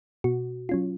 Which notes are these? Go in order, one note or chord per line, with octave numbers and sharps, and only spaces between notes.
B2 F#4
F#3 C#4 F4